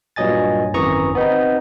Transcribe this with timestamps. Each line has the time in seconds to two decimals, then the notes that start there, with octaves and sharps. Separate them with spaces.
0.16 G2 A#2 F#3 D#5 G#5 A6
0.73 G#1 F#2 E3 A#5 C#6 D#6
1.15 B3 C4 D#4